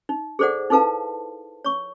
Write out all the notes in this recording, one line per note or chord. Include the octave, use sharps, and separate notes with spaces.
D#4
G#4 A4 C5 D5 F#5
D#4 E4 A4 B4 F5 A5
C#5 C#6